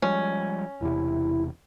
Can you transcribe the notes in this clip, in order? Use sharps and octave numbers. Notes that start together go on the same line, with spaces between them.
F3 G3 G#3 C#4
E1 E2 C3 E4